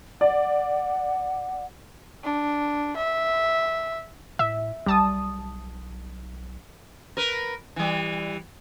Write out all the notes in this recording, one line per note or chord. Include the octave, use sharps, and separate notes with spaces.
D5 F#5
D4
E5
A2 E5
B1 G3 A5 D#6
A#4 B4
E3 G3